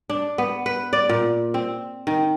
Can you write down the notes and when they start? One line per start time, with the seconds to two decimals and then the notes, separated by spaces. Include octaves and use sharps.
0.10 D4
0.38 B3
0.66 B4
0.93 D5
1.09 A#2
1.54 C4
2.07 D#3